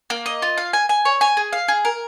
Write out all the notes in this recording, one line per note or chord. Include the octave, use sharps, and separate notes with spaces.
A#3
D#5
F4
F5
G#5
G#5
C#5
G#5
G#4
F5
G#4
A#4